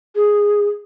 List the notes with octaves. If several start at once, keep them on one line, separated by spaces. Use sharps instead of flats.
G#4